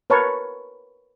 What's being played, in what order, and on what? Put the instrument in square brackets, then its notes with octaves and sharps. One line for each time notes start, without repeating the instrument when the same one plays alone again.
[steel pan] A#4 B4 C#5 A5 C#6